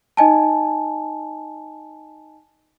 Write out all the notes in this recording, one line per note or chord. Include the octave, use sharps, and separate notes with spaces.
D#4 D#5 G#5 A5